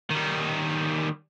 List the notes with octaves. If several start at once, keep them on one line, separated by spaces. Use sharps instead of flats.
D#3 G3